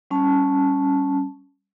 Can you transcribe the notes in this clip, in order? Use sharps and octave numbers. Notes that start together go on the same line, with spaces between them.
G3 C#4 A5